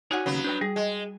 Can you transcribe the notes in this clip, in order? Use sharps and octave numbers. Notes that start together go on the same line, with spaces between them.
D#4 F#4 C#5 D5 F#5 G#5
D#2 C#3 F#3 B3
D4 B4 G5 G6
G3 G#4
G#3